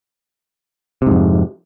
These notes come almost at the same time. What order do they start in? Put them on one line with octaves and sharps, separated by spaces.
C3 G#2 F2